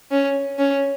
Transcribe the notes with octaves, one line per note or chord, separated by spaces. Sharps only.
C#4
C#4